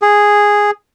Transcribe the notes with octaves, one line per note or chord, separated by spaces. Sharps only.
G#4